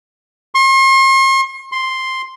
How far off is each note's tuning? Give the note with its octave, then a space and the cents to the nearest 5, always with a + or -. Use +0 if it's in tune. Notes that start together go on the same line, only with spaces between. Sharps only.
C6 +45
C6 +0